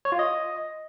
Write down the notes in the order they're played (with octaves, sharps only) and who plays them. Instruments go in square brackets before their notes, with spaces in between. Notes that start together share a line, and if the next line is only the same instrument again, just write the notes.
[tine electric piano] C#5
F4
D#5